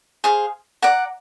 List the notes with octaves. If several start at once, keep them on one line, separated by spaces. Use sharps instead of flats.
G#4 C5 F5
D5 F#5 A#5